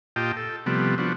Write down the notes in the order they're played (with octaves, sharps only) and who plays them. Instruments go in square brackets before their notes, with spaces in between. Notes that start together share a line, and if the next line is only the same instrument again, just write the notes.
[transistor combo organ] A#2 F4 G4 D#5 G5 A5
A4
C3 F3 G3 A3 B3
F3 B3 D4 F#4